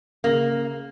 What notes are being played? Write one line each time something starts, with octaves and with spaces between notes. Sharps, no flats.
C#3 A#3